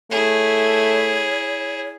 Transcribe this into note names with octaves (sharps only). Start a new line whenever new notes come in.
A3 E4 G#4 C#5